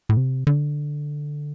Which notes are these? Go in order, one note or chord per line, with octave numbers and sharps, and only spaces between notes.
A2
C3
D3